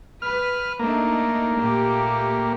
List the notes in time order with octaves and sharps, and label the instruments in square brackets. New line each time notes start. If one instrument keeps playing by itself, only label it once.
[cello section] B4 [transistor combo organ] F6
[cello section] A3 D4 D#4 [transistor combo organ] A#3
[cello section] A#2 A3 G4